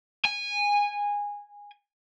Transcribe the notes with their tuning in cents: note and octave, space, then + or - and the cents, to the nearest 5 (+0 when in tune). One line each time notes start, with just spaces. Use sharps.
G#5 -15